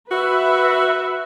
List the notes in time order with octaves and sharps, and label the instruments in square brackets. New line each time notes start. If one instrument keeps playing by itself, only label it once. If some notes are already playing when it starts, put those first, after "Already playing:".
[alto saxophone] F#4 [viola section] B4 E5